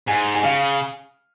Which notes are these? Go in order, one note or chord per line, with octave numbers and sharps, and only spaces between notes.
G#2 G#5
G#5
C#3 F5